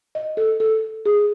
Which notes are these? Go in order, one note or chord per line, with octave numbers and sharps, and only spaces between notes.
D#5
A4
A4
G#4